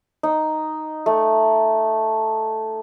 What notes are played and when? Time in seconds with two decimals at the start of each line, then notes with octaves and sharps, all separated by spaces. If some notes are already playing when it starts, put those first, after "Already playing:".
0.23 D#4
1.06 A3